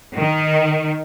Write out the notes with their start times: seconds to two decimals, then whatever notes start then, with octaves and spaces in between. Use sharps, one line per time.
0.18 D#3